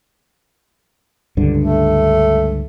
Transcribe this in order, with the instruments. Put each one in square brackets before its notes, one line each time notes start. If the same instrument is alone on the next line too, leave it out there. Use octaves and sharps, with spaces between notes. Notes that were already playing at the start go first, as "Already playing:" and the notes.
[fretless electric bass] C#2 G2 D3
[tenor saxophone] A3